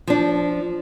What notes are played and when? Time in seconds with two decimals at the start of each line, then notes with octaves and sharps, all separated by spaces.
0.07 F3 D4